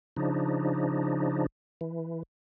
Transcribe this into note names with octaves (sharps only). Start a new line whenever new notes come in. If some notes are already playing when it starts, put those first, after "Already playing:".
C#3 F3 D4 D#4
E3